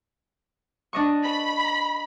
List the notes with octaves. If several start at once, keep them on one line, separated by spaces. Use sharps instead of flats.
D4 D#5 C#6
B5